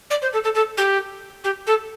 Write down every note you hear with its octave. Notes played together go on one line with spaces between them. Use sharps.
D5
C5
A4
A4
A4
G4
G4
A4